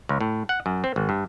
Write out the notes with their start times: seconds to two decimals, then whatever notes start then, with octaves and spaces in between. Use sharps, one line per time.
0.09 C#2
0.21 A2
0.49 F#5
0.66 F#2
0.84 C4
0.96 G#1
1.09 G2